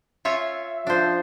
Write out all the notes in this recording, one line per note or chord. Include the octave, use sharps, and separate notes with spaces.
F4 C#5 E5 G#5
F3 D4 C5